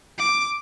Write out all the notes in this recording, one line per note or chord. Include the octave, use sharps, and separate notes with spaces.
D6